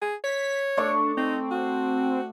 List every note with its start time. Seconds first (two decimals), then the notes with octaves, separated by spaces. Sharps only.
0.02 G#4
0.24 C#5 B6
0.77 A3 D4 D5 C#6
1.17 C4 D#4
1.51 F#4